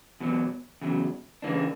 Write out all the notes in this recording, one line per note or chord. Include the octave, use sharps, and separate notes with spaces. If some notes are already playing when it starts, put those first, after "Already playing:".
E2 B2 F#3
E2 C#3 F#3
C#3 E3 A#3 D4